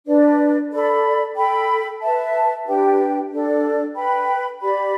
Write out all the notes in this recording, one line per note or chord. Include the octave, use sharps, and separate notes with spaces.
D4 B4 D5
A4 D5 B5
A4 G5 B5
B4 E5 A5
D4 G4 B4 G5
D4 A4 D5
B4 G5 B5
G4 D5 B5